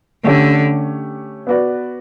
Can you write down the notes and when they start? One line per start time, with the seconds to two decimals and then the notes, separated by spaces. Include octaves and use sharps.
0.24 D3 A3 C#4 G4 C#5
1.47 B3 F#4 B4 D5